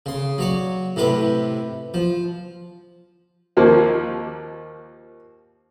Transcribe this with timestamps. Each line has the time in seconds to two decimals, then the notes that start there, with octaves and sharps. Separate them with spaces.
0.06 C#3 C6
0.38 F#3 C#5 D5
0.96 A2 C3 G4 B4
1.94 F3
3.57 D#2 F3 A#3